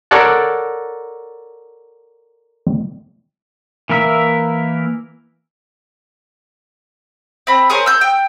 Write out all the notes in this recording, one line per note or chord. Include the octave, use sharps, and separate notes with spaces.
A4 A#4 C#5 D5 F#5 A5
E3 A#3 A#4 E5
C4 B5
G#4 A#4 C5 C#5
E6 G6
G5